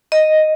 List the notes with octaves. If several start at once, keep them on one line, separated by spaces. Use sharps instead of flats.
D#5